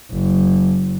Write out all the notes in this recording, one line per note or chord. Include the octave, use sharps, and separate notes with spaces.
F#1